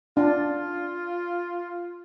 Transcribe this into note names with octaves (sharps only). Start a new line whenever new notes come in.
D4 F4